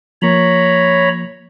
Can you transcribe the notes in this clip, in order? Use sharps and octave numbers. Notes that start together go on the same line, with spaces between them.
F3 A#3 C#5 A#5 B5